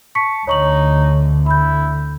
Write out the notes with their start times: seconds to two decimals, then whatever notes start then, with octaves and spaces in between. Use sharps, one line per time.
0.15 A5 C#6 B6 C#7
0.47 D2 D3 D#4 C#5 C#6 F#7
1.46 E4 B5 G6